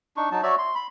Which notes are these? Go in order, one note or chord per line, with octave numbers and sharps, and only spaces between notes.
D4 D#4 C#6
F#3 D#4 A5
F#4 C#5 D5 E5
C6
B5